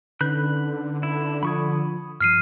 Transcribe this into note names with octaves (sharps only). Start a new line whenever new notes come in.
D3 C#4 D#4 B4 B5 F#6 G6
E4
F3 F4 B5 C#6 D#6 G#6
G2 F3 F6 C7 D#7